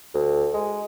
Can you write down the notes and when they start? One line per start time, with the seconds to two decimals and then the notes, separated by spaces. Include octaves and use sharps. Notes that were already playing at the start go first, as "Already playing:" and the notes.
0.15 D2
0.54 G#3